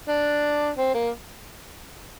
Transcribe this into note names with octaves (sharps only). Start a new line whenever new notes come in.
D4
C4
A#3